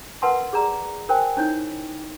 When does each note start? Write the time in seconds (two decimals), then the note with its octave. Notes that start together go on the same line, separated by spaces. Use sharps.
0.22 A#4 B4 F#5 A5 C6
0.53 G#4 D5 A#5
1.09 A#4 C5 G5 G#5
1.37 C#4 D#4 E4 C#5